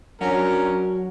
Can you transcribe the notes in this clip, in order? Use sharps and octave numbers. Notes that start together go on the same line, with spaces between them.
F#3 C#4 D4 A#4